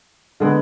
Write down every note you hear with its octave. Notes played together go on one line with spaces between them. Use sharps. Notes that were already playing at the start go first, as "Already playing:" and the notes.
D3 G#3 B3